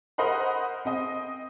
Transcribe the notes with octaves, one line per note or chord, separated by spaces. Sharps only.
A#4 C5 D#5 F#5 B5
C4 D#5